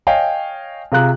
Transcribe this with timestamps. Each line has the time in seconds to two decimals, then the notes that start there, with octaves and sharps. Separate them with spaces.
0.07 C#5 D#5 F5 G5 G#5
0.92 C3 F4 G#4 F5 A#5 F#6